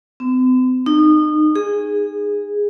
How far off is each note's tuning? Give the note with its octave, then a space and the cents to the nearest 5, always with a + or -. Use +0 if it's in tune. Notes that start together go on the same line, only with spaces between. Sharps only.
C4 -45
D#4 -30
G#4 -15